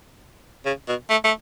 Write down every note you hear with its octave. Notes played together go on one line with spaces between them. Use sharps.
C#3
B2
A3
A3